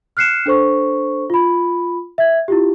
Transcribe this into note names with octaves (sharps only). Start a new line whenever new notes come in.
F6 F#6 C7 C#7 E7
D4 A4 C5 C#6
F4 B5
E5 G#6
E4 F4 G4